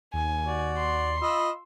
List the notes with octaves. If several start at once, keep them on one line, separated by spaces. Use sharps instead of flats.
D#2 G#5
F#4 D5
C6
F4 D#5 B5 E6